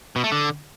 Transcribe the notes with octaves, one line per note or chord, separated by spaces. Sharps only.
B2
A3
D3